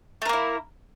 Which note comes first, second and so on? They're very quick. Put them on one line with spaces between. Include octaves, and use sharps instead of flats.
A3 A#4 A#3 E4